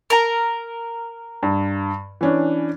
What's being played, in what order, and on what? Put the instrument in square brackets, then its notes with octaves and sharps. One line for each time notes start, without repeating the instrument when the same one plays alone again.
[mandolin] A#4 A#5
[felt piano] G2
E3 C#4 D4